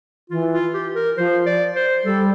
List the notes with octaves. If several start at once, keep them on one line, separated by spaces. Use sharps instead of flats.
E3 F4
F4
G4
A#4
F3 C5
D5
C5
G3 A4